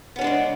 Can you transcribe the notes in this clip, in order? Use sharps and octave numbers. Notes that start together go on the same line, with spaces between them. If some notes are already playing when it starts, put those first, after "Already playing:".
C#3 G#3 B3 C#4 D4